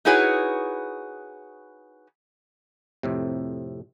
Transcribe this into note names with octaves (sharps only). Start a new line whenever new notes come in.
D#4 E4 F#4 G#4 B4 C#5
F2 A2 C3